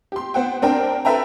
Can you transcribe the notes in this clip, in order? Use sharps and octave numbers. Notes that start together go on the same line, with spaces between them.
G4 C6
B3 C5 F#5 G5
C4 D4 A#4 G5
A4 B4 E5 G5 A#5